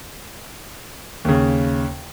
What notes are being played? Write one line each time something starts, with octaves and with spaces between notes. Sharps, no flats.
D#2 C#3